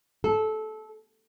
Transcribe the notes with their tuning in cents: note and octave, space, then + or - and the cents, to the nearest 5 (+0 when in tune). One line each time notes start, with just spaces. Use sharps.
A4 -20